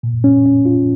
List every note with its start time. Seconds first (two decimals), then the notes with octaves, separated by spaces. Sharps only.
0.03 A#2
0.24 C#4
0.46 C#4
0.66 F4